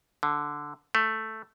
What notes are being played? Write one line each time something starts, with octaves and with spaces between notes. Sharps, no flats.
D3
A3